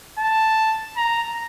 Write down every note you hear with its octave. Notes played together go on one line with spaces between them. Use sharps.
A5
A#5